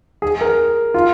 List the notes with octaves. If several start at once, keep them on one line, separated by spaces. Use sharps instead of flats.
G#4
A#4
F4